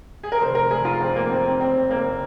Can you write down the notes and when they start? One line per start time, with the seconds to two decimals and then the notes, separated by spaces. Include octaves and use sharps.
0.23 G#4
0.32 A#4
0.41 F1 C5
0.55 A#4
0.71 F1 G#4
0.85 F4
1.00 F2 C4
1.16 A#3
1.30 F2 C4
1.45 C4
1.60 F#1 C4
1.89 F#1 A#3